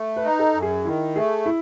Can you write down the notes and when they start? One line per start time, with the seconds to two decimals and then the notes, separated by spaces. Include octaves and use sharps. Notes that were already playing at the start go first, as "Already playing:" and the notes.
Already playing: A3
0.16 B4
0.25 D#4
0.39 A4
0.54 F#2
0.62 G#4
0.85 D#3 E4
1.16 A3 G#4
1.46 E4